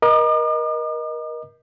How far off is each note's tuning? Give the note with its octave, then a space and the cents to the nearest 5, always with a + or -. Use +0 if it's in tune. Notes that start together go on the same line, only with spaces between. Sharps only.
A#4 +30 D#5 +0 D6 +45